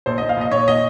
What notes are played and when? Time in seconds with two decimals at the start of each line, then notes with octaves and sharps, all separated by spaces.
0.06 A#1 C5
0.18 A#1 D#5
0.29 F5
0.37 A#1 D#5
0.51 A#1 C#5
0.68 A#2 D#5